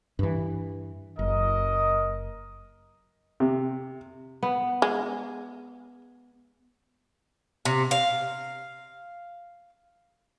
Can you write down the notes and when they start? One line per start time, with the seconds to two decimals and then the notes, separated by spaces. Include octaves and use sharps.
0.19 G2 E3
1.19 F#1 A#4 D#5
3.40 C3
4.43 B3
4.82 G#3
7.65 C3
7.91 F5